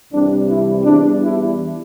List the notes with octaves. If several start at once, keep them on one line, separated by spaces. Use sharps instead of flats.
C2 C3 E3 G3 C4 D4
E4
E2 E3 G3 D4
E4